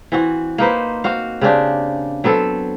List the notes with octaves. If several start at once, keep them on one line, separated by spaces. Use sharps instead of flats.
E3 C4 F#4
A#3 D#4 B4 C5
C4 F#4 F5
C#3 C4 D4 G4
F#3 B3 C4 A4